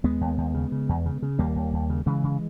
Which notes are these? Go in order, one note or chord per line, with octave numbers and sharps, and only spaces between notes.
D#2 G#3 B3
D#2
D#2
C#3
C#3
E2
C#3
C#3
D#2 G3 A#3
D#2
D#2
C#3
C#3 E3 G#3
C#3